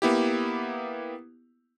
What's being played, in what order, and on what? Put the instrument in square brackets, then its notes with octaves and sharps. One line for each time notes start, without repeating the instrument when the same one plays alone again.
[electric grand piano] A#3 B3 E4 G4